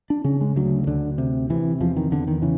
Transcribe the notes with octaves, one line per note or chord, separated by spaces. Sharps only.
D4
C#3 C#4
G#3
D2 F#3
D2 D3
C3
C3 E3
E2 F3
D#3
E2 D3
D#3
C#3 E3